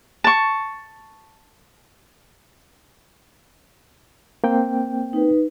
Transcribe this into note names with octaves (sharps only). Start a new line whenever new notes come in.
A5 C#6
A#3 C4 G5
D#4 B4